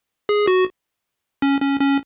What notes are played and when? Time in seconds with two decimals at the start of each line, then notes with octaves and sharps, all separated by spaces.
0.29 G#4
0.47 F#4
1.42 C#4
1.61 C#4
1.80 C#4